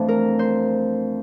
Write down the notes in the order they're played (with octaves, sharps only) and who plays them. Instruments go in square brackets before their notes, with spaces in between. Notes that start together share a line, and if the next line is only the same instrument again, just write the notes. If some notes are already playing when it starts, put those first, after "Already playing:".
Already playing: [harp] F2 E3 A3 D4 C5
A#4
C5